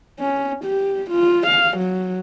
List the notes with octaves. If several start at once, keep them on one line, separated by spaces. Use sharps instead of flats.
C#4
G4
F4
F5
F#3